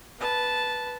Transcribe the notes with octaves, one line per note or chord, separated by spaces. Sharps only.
B4 A5